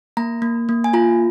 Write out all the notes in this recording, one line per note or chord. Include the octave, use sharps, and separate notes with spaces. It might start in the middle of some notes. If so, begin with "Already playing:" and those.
A#3 A#5
A#3
A#3
G#5
F4 A#5